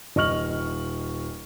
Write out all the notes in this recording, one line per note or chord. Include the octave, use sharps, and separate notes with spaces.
D#1 D#5 C#6 F6 F#7